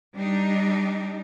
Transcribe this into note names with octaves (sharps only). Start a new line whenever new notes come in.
G3 D4 D#4